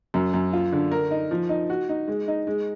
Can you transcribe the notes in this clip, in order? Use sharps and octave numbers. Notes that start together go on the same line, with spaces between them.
F#2
F#2
F4
D3
A#4
D#4
F3
D#4
F#4
D#4
G#3
D#4
G#3